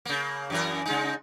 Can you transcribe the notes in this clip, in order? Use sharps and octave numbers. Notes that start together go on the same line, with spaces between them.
C#3 A#3
F#2 E3 A#4
C#3 G#3 D#4